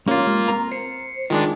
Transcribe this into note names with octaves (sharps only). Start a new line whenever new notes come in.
A#3 C#4 F4 G4 C#5
G#3
C4 A#4 A#5
C5 C7 C#7
D#3 G#3 D4 F4